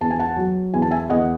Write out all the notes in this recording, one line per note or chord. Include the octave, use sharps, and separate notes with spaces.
E2 A5
G#5
F#5 A5
F#3
E2 G#5
A5
E5 G#5
E2 D#5 F#5